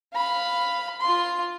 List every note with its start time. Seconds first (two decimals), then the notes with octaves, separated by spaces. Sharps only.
0.14 F5 B5
1.01 F4 C6